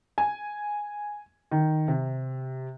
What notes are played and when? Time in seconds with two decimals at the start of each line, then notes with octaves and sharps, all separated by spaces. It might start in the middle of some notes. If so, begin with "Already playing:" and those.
0.18 G#5
1.51 D#3
1.88 C3